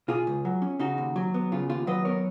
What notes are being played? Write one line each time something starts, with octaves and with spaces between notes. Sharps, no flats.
B2 F4 G#4
C#2
F#3
C#4
C#3 D#4 F#4
D#2
F#3
B3
C#3 F4
D#2 F4
F#3 B4 D#5
B3 A#4 C#5